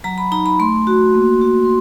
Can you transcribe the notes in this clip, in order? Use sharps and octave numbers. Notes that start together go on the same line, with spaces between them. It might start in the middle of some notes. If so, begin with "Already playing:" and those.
F#3 A#5
B5
D#4 A#5
B5
A3 C6
F#4
A#3
F#4
C6